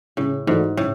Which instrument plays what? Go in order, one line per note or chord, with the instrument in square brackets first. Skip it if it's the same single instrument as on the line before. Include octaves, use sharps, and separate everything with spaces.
[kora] A2 [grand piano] C#3
[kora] G#2 [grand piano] E3 A3 D4 F#4
[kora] A2 [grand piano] C#3